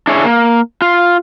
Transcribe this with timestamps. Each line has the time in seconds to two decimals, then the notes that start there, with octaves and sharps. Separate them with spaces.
0.07 D4 E4 G#4 C#5
0.24 A#3
0.82 F4